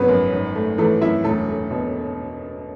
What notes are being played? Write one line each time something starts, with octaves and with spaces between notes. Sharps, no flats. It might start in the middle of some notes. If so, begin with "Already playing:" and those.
Already playing: G#1 C#3 F#3 B3 C#4 B4
F#2
G#1
A3
E3 A3 A4
F#2 E4 E5
E1 A3 A4
A3
B2